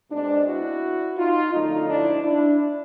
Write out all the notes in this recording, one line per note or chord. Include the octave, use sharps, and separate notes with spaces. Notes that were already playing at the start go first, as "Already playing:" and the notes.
B2 G#3 C4 D4
E4 F#4
D#4 F4
F#2 D3 F3 A3 D#4
D4 E4
D4 E4